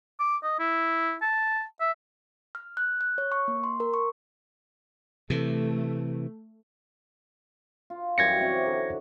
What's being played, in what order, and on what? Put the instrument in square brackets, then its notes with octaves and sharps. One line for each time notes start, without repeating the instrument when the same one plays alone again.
[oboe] D6
D#5
E4
A5
E5
[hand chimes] F6
F#6
F#6
C#5
C#6
A#3
C6
A#4
C#6
[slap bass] C3 E3 [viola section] A3
[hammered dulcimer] F4
[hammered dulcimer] F#2 E3 G3 [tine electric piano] G#6 A#6 C#7
[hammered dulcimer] C3 C#5 F#5
D3 D#4